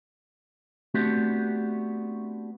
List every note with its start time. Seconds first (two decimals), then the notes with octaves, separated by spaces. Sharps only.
0.94 A3 B3 C4 D4 F#4 G4